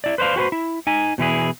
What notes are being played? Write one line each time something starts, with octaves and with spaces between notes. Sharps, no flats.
E4 D5
B4 C5 D5 F5
F#4 G4 B4 C5
E4
D#4 G#5
B2 E3 E4 G#4